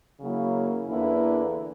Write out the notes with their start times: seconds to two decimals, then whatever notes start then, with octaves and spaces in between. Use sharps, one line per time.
0.20 C#3 F#3 A#3 E4
0.88 E2 D3 A#3 E4 B4